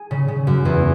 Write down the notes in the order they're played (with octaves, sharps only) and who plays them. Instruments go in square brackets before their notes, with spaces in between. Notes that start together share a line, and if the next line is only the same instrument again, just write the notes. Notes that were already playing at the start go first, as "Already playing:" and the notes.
Already playing: [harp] G#4
C#3
C#3
F#2
E2